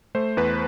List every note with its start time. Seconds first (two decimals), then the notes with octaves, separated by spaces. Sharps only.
0.15 A3 C5
0.37 E2 B4